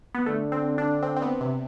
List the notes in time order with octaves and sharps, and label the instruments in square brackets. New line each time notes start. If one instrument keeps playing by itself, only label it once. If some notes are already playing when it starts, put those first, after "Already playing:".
[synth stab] B3
[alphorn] D3 [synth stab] A3
[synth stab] C4
D4
C4
C4
B3
C3